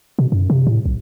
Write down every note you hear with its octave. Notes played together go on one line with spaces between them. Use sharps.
B2
F#2
C3
A2
B1